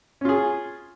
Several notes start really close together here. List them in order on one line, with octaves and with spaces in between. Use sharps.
C#4 F4 G#4